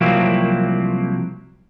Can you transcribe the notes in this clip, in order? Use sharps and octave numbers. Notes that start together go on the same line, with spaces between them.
C2 F3 F#3 A#3 C4 E4